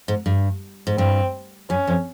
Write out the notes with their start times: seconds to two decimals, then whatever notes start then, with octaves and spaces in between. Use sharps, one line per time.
0.08 G#2
0.26 G2
0.87 G#2
0.98 G2 C4
1.70 F#2 C#4
1.87 F2